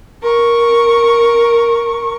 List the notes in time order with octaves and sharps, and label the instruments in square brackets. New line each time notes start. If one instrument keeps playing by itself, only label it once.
[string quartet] A#4 C#6